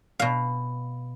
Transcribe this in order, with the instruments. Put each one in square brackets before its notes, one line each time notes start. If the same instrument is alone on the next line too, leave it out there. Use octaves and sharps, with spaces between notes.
[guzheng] B2 F5